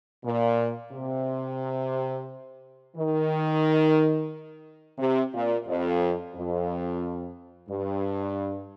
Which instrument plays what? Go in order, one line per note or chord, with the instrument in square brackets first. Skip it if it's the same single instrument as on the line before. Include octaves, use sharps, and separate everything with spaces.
[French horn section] A#2
C3
D#3
C3
A#2
F2
F2
G2